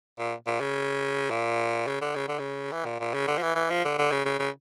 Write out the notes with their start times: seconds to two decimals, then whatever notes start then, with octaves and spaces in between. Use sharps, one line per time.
0.19 A#2
0.47 A#2
0.60 C#3
1.30 A#2
1.87 C#3
2.01 D3
2.16 C#3
2.28 D3
2.39 C#3
2.72 E3
2.85 A#2
3.00 A#2
3.14 C#3
3.27 D3
3.37 F3
3.42 E3
3.55 E3
3.70 F3
3.84 D3
3.98 D3
4.11 C#3
4.25 C#3
4.39 C#3